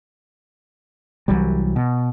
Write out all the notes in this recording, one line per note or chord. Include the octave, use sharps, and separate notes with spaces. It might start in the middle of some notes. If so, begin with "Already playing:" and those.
C2 E3 F#3 G3
B2